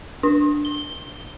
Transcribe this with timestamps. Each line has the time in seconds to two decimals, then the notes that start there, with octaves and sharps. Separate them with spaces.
0.23 D4
0.65 G7